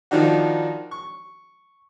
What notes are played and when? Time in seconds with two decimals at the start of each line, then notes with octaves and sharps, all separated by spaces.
0.11 D#3 F3 D4 D#4 F#4
0.91 C#6